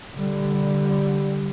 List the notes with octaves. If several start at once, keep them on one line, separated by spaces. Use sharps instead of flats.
D3 G3